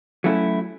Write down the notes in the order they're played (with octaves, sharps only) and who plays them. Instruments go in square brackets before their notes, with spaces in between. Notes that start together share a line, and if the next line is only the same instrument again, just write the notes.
[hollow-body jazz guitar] F#3 A3 C#4 E4